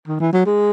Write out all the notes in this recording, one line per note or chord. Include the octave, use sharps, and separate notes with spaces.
D#3
E3
F#3
G#3